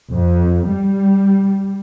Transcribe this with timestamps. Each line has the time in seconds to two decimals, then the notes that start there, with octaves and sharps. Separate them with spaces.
0.10 F2
0.70 G3